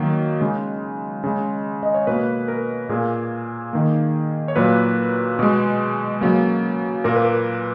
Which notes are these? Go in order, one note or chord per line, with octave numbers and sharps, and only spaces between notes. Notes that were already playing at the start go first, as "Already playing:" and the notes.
Already playing: D#3 F#3 A#3
C#3 G#3
C#3 G#3
D#5
C#5
B2 A#3 B4
A#4
A#2 A#3 G#4
D#3 A#3
C#5
A#2 F#3 A#3 B4
B2 G#3
C#3 F#3 A#3
A#2 A#3 A#4
B4
A#4